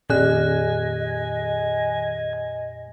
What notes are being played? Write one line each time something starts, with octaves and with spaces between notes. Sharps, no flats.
F2 A#2 D#3 G4 D#5 G#5 F#6